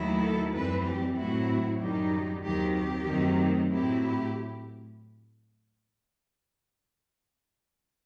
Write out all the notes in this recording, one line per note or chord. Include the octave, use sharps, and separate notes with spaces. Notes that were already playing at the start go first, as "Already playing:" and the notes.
Already playing: D#2 D#3 F#3 A3 E4
A4
F#2 E3 G3 C4 B4
G4
A2 F#3 C4 E4 F#4
F#2 D#3 G3 D#4 G4
D#2 D#3 F#3 C4 G4
G4
F#2 D#3 F#3 A3 C4
A2 F#3 C4 E4 G4
G4